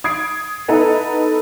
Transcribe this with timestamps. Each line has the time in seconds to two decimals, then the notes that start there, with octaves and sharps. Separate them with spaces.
0.04 D#6 G#6 C7 D7
0.68 B3 D#4 E4 A4 B4 A#5